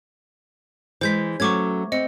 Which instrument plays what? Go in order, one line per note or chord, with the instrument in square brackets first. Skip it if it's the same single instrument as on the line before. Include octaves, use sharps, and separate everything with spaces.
[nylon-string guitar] E3 G#3 [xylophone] C5 G6 B6
[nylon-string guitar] F#3 A3 C#4 [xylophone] C#6 D6 G#6
[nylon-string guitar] C4 [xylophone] D#5 C#7